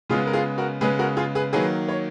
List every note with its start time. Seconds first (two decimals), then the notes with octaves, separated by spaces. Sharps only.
0.09 C#3 G#3 B3 F4 G#4
0.27 A#4
0.33 F4 G#4
0.58 F#4 A#4
0.81 C#3 G#3 B3 G#4 B4
0.99 F#4 A#4
1.17 F4 G#4
1.35 G#4 B4
1.53 D#3 F#3 A#3 G#4 B4
1.88 C#5